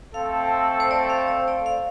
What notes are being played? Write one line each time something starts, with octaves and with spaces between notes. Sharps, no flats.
A3 C4 A4 F5
C5
D5
F5
D5
D5
F5